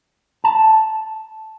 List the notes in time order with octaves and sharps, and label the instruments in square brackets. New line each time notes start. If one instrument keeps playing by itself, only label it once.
[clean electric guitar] A5